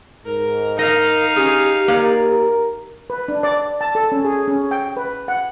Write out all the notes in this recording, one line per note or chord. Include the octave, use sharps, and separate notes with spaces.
G#2 A#4
D#4 A#4 D#5 F5
C#4 G4 G#4
A#3 A#4 D5
B4
D4
D5
A5
A4
C#4
G#4
C#4
G5
B4
F#5